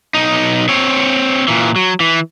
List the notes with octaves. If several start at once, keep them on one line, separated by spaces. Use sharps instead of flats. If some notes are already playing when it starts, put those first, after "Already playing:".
B1 D#4
C4 C#5
A#2 E3
F#3
E3